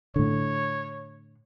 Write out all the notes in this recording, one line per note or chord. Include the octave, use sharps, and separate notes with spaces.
A2 D3 C#5